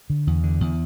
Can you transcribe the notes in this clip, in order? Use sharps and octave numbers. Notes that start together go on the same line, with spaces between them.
D3
E2
D3
E2